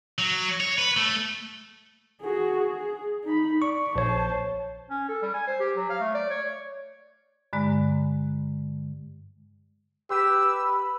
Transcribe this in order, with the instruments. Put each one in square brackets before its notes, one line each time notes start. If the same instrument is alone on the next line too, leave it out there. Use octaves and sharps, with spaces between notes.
[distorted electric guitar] F#3
C#5
B4
A3
[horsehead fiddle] F#4 G#4
G#4
D#4 B5
[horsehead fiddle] D5 [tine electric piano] C#6
[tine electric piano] A#1 C#5 [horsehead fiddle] C5 A5
[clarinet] C#4
A4
G3
G#5
C5
G4
F#3
F5
A3
D5
C#5
[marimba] G2 D3 G#3 D5 A#5
[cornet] G4 [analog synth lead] B4 [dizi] E6